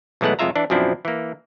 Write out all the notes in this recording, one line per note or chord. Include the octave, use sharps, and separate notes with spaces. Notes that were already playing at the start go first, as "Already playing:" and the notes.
B1 E3 G#3 A3 B3 F#5
C2 F2 G#3 F4 E5 A#5
E3 D4
F#2 B2 F3 C4 D4 E4
E3 A#3